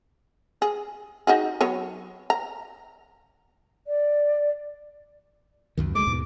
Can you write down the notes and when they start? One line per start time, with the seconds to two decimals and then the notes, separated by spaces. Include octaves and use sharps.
0.62 G#4
1.27 D#4 F#4 G#4
1.61 F#3 B3 C#5
2.30 A#5
3.87 D5
5.77 C#2 F#2 D#3
5.95 D2 G#3 D6
6.07 D#2 G#2 B2